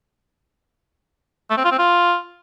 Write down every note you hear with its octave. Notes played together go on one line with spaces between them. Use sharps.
A3
C4
F4
C4
F4